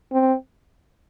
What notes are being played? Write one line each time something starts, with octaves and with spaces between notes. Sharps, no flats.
C4